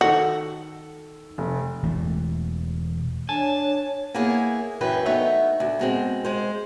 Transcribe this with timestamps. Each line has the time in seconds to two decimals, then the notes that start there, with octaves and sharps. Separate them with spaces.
0.01 D#3 F#4 A4
1.38 F1
1.83 E1 E3 A3
3.29 D4 C#5 G#5 A5
4.14 A#3 B3 E4 G#4 C#5
4.81 F#2 E3 B4 G5 G#5
5.06 A3 B3 D#4 C#5 E5
5.60 D2
5.79 B2 G#3 C4
6.25 G#3 C5